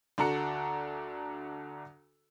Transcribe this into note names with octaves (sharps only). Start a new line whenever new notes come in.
D2 D4 F#4 A4 A#5 C#7